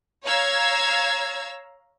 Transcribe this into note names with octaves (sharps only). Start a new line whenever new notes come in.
C#5 F5 A#5 E6 G#6